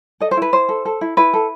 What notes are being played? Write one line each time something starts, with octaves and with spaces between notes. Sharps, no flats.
A4 D#5
C5
E4 B4
E4 C5
A4
A4
E4
E4 B4
A4